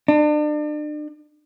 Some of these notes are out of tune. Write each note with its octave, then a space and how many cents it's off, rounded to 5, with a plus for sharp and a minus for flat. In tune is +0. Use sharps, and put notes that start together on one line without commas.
D4 +35